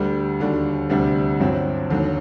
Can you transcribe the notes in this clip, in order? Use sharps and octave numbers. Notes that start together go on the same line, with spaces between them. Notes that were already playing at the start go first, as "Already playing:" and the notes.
Already playing: D2 D3 G3
D#2 D3 G3 D4 F#4
D2 C3 G3 D4
G1 G2 F#3 C4
D#2 D3 F#3